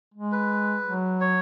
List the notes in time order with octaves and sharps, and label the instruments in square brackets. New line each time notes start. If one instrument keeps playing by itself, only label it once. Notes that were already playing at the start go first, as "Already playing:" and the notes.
[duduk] G#3
[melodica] B4
[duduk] F#3
[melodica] C#5